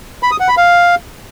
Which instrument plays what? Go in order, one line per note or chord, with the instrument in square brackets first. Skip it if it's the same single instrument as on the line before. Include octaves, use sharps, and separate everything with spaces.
[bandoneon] B5
D#6
F#5
B5
F5